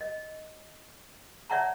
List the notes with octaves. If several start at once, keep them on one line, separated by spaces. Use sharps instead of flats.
D#5
C#5 D5 E5 F#5 A5 A#5